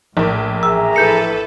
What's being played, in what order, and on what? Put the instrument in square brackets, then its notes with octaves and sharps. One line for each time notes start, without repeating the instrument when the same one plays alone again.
[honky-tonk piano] A#1 A#4 [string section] A2
[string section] A1 [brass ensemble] G#4 E5 A#5 [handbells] E6
[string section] E4 A4 B4 [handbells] G6 C#7